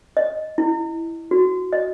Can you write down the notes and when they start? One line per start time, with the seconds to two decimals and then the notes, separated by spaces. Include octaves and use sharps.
0.17 D#5
0.58 E4
1.31 F#4
1.73 D#5